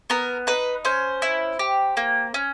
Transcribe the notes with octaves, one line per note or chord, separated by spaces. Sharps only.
B3 A#4
D#4 B4
C#4 C5
E4
G4
A#3
C#4